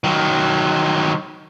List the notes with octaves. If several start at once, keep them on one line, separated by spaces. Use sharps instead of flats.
D#3 F#3